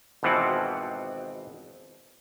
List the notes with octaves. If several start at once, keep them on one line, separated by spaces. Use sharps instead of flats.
G#1 B2 E3 F3 C4 F#5